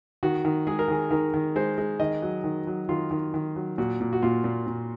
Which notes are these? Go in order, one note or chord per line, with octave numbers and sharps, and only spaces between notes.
D#3 F#4
D#3
G#3 G#4
A#4
D#3 G#4
D#3 A#4
D#3
G#3 C5
G#3
D#3 D#5
F#3
D#3
F#3
D#3 F4
D#3
D#3
F#3
A#2 F#4
A#2
F#4
A#2 F4
A#2
A#2